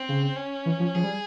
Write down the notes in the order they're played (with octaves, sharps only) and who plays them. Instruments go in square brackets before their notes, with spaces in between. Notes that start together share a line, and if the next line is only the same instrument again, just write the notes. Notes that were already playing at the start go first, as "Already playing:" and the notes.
Already playing: [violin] C4
[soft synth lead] C#3
[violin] C#4
[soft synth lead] E3
F3
[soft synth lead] F3 [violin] G#4
[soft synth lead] G3